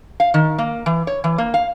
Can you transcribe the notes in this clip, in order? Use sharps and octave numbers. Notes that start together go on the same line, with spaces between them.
F5
D#3
A#3
E3
C#5
E3
A#3
F5